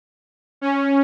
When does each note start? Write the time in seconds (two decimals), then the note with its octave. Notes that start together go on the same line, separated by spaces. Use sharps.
0.61 C#4